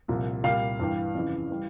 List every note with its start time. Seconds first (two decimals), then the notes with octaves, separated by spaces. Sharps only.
0.08 C2 A#2 F3
0.43 C2 A#2 G3 F5
0.80 G2 E3 G3
1.15 F2 C#3 E3
1.50 E3 G3